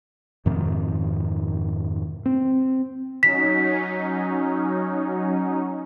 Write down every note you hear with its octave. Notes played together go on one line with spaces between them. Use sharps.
F2 G#2 C3 D#3
C4
F#3 C#4 D#4 B6